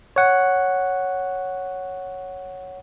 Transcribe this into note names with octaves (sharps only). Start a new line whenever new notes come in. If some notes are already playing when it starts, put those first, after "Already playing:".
C#5 F#5